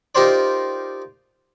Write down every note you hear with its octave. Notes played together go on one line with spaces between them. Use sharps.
D#4 F4 G4 A#4 C5 D5